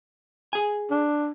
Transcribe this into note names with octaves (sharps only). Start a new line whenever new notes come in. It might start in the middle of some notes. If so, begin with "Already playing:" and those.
G#4 G#5
D4